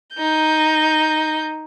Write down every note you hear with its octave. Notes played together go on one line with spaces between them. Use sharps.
D#4 G6